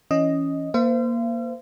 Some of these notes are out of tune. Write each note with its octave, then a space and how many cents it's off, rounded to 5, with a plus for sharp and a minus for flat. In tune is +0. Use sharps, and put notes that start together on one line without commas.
E3 +0 C#4 +0 D#5 +0
A#3 +10 C5 -25 F5 -45